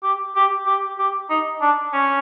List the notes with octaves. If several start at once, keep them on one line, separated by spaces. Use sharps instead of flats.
G4
G4
G4
G4
D#4
D4
C#4